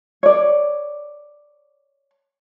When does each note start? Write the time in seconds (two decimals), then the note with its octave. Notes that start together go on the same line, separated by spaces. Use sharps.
0.23 C#5 D5